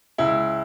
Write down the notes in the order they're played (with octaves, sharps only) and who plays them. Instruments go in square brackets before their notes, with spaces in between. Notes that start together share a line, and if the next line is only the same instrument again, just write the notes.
[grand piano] C#2 E4